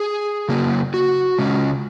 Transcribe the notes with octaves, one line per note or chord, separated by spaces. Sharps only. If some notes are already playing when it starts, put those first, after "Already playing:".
Already playing: G#4
C#3 F#3 A#3
F#4
C#3 G#3 C#4